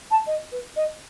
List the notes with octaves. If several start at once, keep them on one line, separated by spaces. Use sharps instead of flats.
A5
D#5
B4
D#5